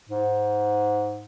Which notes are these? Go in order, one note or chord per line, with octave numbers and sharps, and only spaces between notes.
G#2